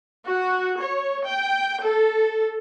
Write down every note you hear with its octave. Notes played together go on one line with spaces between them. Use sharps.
F#4
C#5
G5
A4